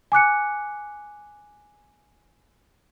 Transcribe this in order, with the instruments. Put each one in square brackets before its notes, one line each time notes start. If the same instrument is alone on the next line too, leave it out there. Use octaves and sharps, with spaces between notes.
[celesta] G#5 D6 F#6 C#7